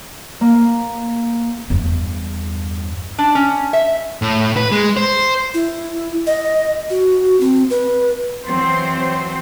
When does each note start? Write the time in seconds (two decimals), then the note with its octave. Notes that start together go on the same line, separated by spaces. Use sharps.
0.41 A#3
1.70 E2 G2
3.18 D4
3.35 C#4
3.73 E5
4.22 A2
4.57 B4
4.72 G#3
4.97 C5
5.54 E4
6.27 D#5
6.90 F#4
7.40 C4
7.70 B4
8.47 E3 F#3 C4 C5